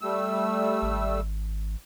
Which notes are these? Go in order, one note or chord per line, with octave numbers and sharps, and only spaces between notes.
G3 A3 E6
G#1